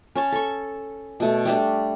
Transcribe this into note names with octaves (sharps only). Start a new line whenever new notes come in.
C#4 C#5 A5
A4 C#6
B2 A3
G3 A3 D4